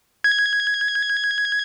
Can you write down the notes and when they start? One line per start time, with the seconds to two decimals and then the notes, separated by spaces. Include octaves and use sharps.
0.24 G#6